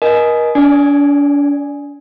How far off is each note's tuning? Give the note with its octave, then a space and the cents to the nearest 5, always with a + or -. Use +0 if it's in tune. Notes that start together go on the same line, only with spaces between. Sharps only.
A#4 +35 D#5 +0 G#5 +25
D4 -40 D5 +0 G#5 +0